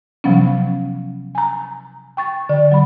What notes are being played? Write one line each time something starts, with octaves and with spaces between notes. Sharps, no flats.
C3 F3 F#3 B3 C#4
G#5 A#5
G5 C#6 A6
D3 D5
F#3 B5